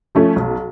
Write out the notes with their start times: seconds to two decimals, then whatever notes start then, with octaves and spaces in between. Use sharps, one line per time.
0.15 F3 A3 C#4
0.36 B1